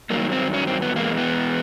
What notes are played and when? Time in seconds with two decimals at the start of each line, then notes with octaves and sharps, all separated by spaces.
0.10 G2 D#3 F#3 A#3
0.32 C4
0.54 C#4
0.67 C4
0.82 B3
0.96 E2 B2 G#3 A#3
1.18 B3